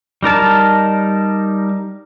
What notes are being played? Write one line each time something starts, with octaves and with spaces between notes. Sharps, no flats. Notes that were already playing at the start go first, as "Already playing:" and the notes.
G3 D#4 A#4 A5